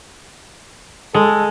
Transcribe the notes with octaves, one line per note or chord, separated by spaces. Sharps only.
G#3 A4